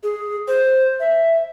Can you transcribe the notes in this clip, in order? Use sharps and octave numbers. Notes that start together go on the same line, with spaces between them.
G#4
C5
E5